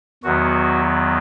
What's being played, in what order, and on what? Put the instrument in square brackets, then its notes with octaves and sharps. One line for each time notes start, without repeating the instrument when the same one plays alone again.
[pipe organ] E2 D#3 F#3 B3 F#4